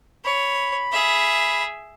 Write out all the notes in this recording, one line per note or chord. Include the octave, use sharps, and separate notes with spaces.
C#5 B5
G#4 E5